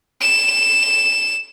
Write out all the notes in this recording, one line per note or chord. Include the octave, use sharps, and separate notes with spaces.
E7